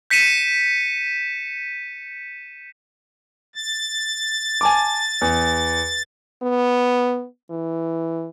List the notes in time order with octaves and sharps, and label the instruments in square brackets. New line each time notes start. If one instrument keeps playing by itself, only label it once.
[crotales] G6 B6 C#7 D#7 E7
[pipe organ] A6
[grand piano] G#5 A5 D6
E2
[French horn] B3
E3